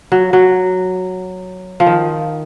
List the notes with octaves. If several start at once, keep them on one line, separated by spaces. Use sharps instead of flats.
F#3
F#3
F3
D#3